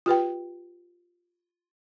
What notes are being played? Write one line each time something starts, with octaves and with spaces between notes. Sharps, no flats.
F4 G4 B4 G5